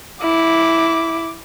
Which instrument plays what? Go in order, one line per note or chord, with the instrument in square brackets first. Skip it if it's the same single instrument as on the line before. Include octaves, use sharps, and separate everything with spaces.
[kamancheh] E4 D6